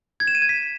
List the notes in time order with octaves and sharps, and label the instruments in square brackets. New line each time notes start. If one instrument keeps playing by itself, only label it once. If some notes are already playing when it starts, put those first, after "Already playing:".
[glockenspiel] G#6
E7
D#7
G#6
B6